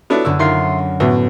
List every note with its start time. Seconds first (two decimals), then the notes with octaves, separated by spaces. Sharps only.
0.10 B3 D4 E4 F#4 A4 C#5
0.25 F#2 D3 F#4 E6
0.39 D#3 F4 E5 C6 C7
1.00 D2 A2 B3 F#4 B4